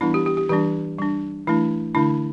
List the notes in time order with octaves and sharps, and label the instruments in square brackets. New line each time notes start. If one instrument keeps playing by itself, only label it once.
[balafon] E3 G3 B3 D4 E4
G4
G4
G4
E3 G3 D4 G4
G3 D4
E3 A3 D4 E4
D3 A3 D4 E4